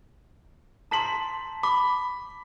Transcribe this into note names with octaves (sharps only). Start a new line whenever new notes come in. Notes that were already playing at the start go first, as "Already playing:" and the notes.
A5 A#5 C6 B6 F#7
B5 D6